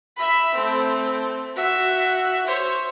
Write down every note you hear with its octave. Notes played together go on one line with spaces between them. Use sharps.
E5 B5
A3 C4
F#4 E5
C5 C#5